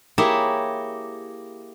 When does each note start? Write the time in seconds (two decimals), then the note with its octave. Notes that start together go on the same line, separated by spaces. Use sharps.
0.18 A#3 E4 G4 G#4 C#5 E5